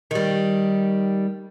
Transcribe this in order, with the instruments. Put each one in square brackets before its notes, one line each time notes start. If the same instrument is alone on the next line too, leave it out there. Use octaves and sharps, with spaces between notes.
[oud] D#3 G3